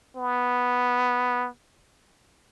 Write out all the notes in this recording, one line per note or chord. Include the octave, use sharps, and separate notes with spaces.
B3